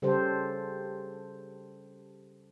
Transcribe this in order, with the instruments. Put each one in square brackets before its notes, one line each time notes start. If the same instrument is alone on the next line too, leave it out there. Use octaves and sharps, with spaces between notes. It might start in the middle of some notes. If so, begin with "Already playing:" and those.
[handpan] C#3 G3 G4 A4 C5